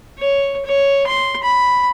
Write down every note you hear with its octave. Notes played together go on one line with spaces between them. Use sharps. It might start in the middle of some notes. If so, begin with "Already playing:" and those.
C#5
C#5
C6
B5